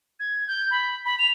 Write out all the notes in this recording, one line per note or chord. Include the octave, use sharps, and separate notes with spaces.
G#6
G6
B5
B5
F7